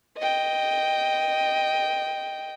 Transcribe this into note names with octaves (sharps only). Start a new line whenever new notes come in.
D#5 G5